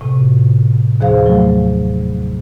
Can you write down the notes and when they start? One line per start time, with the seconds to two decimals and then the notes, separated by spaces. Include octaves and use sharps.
0.01 A2 C3
1.00 D#2 F3 G#4 C5 F5
1.26 F3 F#3 A3